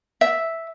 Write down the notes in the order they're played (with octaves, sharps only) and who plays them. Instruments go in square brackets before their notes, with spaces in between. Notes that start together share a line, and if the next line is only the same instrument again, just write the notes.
[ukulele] E5